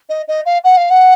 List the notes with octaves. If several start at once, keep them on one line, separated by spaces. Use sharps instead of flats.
D#5
D#5
F5
F#5
F5
F#5